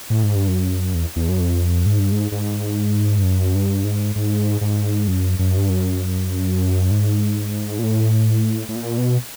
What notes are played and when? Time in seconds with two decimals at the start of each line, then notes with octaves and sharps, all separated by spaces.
0.10 A2
0.23 G#2
0.36 G2
0.48 F#2
0.94 E2
1.16 E2
1.29 F#2
1.40 F2
1.86 G#2
1.99 G2
2.12 G#2
2.32 G#2
3.18 G2
3.23 F#2
3.55 G2
3.85 G#2
4.15 G#2
4.61 G#2
5.08 F#2
5.39 F#2
5.57 G2
5.69 F#2
6.91 G#2
7.79 A#2
7.83 A2
8.69 A2
8.75 A#2
8.98 B2